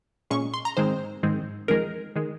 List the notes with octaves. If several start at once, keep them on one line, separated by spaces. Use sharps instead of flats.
A#2 G#3 C#4 C#6
C6
A#5
G#2 D#3 G#3 C4 C5
G#2 D#3 G#3 C4
F2 D#3 G#3 A#4
D#3 G#3